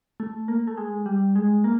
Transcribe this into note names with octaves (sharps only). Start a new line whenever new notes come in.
A3
A#3
A3
G#3
G3
G#3
A#3